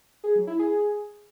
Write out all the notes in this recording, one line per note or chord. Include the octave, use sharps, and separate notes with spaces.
G#4
F#3
E4
G#4